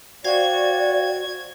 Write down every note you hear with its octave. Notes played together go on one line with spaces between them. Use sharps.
F#4 C5 D5 F5 G5 G#6